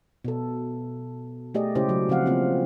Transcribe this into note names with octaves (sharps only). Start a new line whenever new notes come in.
B2 A4
A3 G4 G#4 D5 D#5
C#3 G#3 C#4 E4 G4 C5
C#3 F#3 C#4
C#3 F3 C4 F5 F#5
C#3 A#3 C4 F4